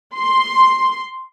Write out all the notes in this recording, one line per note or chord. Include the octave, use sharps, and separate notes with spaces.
C6